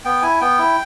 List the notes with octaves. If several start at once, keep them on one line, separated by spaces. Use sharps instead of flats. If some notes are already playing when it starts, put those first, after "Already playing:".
B3 G5
E4 G#5
B3 G5
E4